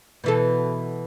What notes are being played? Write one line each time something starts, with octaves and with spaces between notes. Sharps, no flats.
B2 E3 A4